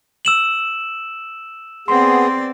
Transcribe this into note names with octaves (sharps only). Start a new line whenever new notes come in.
E6 E7 F#7
B3 C4 G#4 D5 C6